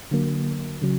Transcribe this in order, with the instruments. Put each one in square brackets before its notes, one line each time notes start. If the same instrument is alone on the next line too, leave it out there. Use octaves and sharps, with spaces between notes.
[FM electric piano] D3 F#3 A#3
C#3 F#3